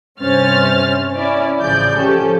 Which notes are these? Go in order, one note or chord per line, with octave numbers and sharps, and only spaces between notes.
G2 C3 C#4 C5 F6 A6
C#4 E4 D5
A1 C#3 F3 D5 G6
F3 C#4 G4 A4